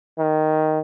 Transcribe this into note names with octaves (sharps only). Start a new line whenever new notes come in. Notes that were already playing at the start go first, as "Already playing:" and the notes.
D#3